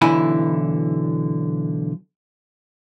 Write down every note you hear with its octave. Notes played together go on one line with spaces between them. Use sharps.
B1 D3 E3 E4 G#5 B5